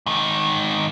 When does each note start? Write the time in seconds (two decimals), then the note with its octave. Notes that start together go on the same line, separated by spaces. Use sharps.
0.06 G#2 D#3